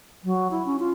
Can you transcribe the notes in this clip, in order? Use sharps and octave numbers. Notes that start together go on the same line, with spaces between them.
F#3
E4
C#4
F4